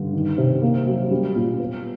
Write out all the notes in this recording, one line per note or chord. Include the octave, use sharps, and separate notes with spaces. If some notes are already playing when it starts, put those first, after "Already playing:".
Already playing: G2 D3
D#3
C3
A#3
F#3
G3
A#2
B3